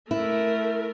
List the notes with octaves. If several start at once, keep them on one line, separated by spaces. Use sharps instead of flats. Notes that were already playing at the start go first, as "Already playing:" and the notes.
A3 E4 A#4